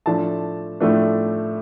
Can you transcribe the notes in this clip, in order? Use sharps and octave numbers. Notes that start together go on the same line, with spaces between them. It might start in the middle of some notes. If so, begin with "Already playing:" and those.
A2 F3 A3 D4 A5
A2 F3 A3 D4